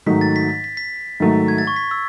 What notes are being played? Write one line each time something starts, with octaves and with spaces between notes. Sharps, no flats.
G#2 D#3 F#3 A3 D#4 B6
A6
B6
B6
B6
B6
G#2 D#3 F#3 A3 D#4
G#6
A6
C#6
B6
E6